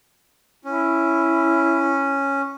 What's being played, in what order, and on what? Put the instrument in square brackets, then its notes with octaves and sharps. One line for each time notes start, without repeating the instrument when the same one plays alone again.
[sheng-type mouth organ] C#4 [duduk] E4